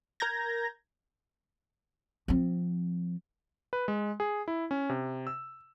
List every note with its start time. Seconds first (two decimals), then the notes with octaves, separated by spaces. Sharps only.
0.20 A#4 A#5 G6 G#6 A#6
2.28 F3 C4
3.73 B4
3.88 G#3
4.20 G#4
4.48 E4
4.71 C#4
4.89 C3
5.27 E6